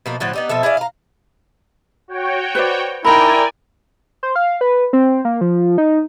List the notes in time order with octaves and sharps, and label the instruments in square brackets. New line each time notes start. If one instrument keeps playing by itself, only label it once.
[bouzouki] B2 F3 A#3
A2 D3 F3 F#4
B3 D#4 G4
B2 F3 A4 E5
E4 G#4 D5 F5
F5 A#5
[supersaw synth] F#4 C#5 G5
[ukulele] B4 C5 D5
[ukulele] D#4 D#5 B5 [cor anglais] E4 [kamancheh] A#4 G5 [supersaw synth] D5 G#5
[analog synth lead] C5
F5
B4
C4
A#3
F3
D#4